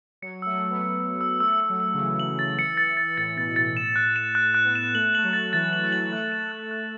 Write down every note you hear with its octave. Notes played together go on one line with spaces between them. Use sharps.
F#3 C#7
A3 E6
F#3
E6
B3
A3 E6
E6
B3
E6
A3 E6
E6
F#3
E6
C#3
E3 E6
F#7
A6
C#7
A6
A6
A2 A6
B2 A6
A2 A6
E7
F#6
E7
F#6
F#6
B3
E7
A3 F#7
A3 F#7
F#3
A6
E3 A6
F#7
A3
F#3 F#7
A3
A3 F#6
E7
F#6
F#6